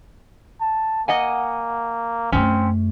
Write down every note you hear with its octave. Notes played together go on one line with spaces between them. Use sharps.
A5
A#3 D#5 F#5 G#5
F#2 A3 C4 C#4